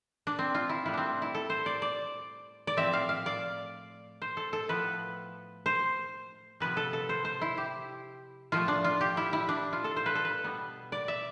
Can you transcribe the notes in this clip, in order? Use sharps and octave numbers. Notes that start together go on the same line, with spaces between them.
D4
C4
F4
E4
A2 G3 B3 E4
C4 D4
E4
A4
C5
D5
D5
D5
A2 F3 C4 E5
F5
F5
D5
C5
A4
A4
A2 F3 B3 B4
C5
C3 F3 B3 B4
A4
A4
C5
C5
E4
G4
A2 F3 A3 F4
D4
F4
G4
E4
E4
D4
F4
A4
C5
B4
A4
B4
B2 G3 B3
D5
E5